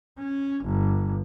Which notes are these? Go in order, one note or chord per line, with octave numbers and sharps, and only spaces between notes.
C#4
G1